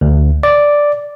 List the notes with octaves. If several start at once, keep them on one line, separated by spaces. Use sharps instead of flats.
D2
D5